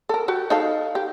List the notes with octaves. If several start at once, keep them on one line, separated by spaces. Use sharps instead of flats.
A4 A#4
F#4 G4
D#4 A4 F5
G4